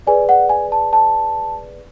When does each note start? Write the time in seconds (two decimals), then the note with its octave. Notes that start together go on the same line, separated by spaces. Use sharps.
0.07 G#4 B4 D5 G#5
0.29 F#5
0.49 G#5
0.72 A5
0.93 A5